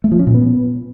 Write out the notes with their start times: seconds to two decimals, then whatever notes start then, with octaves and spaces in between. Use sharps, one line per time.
0.04 A3
0.12 F3
0.19 C#4
0.27 A#2
0.34 B3